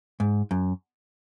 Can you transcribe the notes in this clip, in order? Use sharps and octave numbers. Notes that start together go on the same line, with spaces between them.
G#2
F#2